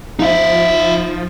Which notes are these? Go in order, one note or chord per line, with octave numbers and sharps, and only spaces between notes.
F3 D#4 E5